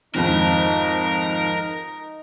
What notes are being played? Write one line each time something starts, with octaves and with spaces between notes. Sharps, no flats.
F2 G#2 D#3 D#4 A#4